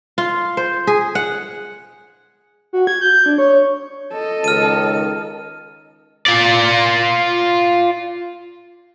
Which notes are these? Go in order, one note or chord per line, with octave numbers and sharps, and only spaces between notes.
F4
C5
G#4
F#5
F#4
G#6
G6
D4
C#5
A4 D#5
C#2 D#3 F6 D#7
F4 D5